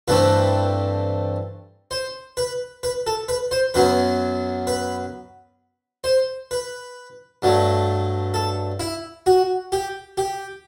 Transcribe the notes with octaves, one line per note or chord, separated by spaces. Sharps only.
G2 E3 A3 C4 B4
C5
B4
B4
A4
B4
C5
F#2 F#3 B3 B4
B4
C5
B4
G2 F#3 A3
A4
E4
F#4
G4
G4